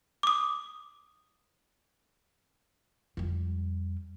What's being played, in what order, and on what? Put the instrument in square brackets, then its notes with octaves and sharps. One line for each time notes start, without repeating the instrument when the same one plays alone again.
[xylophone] D6 D#6
[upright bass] F2 G3